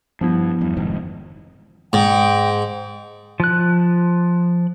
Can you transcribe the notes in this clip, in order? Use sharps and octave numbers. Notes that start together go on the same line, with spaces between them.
G2 F3 B3 E4
E2 G2
F1 G#2 D#3
G#2 G5
F3 F#6